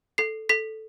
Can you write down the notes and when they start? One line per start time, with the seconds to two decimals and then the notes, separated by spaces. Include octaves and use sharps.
0.18 A4 C7
0.49 A4 B6